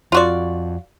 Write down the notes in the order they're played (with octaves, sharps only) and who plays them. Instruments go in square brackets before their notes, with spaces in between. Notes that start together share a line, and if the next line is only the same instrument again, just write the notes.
[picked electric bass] F2 F3 [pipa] F4 F#4 D5